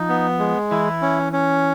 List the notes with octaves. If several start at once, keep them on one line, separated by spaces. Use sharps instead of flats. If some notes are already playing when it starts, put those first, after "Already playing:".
Already playing: F3 D#4
B3
G#3
E3 E4
C#4
C#4